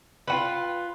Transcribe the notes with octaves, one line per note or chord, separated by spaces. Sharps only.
F4 F#4 B4